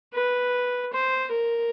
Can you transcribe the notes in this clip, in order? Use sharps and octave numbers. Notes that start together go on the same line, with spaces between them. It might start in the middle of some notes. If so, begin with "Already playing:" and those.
B4
C5
A#4